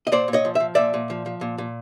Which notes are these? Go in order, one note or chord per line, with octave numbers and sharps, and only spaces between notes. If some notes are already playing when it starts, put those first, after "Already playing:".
D#5
A#2 C5 D5
A#2
C#5 D#5
F3
E5
F3
A#2 D5 E5
A#2
F3
F3
A#2
A#2